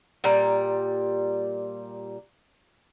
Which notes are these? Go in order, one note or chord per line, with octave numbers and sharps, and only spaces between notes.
A#2 G3 A#5